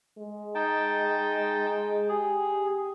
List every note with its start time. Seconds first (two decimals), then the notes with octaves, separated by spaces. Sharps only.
0.18 G#3
0.55 D#4 G5 A5
2.09 G4 G#4